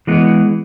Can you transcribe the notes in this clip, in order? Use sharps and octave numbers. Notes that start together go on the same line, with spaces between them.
E3 G#3 B3